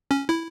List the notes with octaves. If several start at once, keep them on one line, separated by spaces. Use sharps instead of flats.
C#4
E4